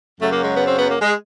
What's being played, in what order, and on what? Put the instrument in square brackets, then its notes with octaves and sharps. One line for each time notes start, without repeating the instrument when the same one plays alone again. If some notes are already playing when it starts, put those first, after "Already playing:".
[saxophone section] F#2 C#3 F#3 A3
A#3
G#3
B3
C4
B3
A#3
G#3